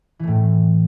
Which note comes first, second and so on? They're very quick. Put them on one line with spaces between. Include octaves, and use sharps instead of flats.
E3 A3 A2